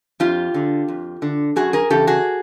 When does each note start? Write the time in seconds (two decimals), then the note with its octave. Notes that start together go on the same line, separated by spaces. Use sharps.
0.20 F2 F4 G4
0.54 D3
0.88 F2
1.22 D3
1.56 F#2 F#4 G#4
1.73 G#4 A#4
1.90 C#3 E3 G4 A4
2.07 F#4 G#4